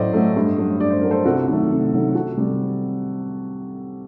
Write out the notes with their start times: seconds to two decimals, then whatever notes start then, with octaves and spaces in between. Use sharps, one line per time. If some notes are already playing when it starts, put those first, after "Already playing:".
Already playing: A2 F#3 A3 C5 D5 D#5
0.13 F#3 A3
0.36 G2
0.58 F#3 A3
0.80 G2 D5
0.90 C5
1.01 F#3 A3 A#4
1.10 A4 C5
1.25 C2 F#4 A4
1.47 C3 D#3 F#3 A3
1.70 C2
1.93 C3 D#3 F#3 A3
2.15 C2 F#4 A4
2.37 C3 G3